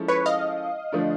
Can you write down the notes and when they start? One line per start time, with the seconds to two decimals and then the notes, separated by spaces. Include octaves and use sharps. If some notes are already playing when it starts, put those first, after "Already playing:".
Already playing: F3 G#3 C#4 E4 A4
0.08 B4 C#5
0.26 D#5 F5
0.92 D3 F3 A3 D4